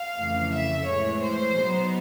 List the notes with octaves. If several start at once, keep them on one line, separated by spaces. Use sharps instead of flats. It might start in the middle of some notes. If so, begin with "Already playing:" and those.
Already playing: F5
F2 C#3 E3 A3
E5
A2 E3 G#3 C#5
C5
B2 F#3 B3 D#4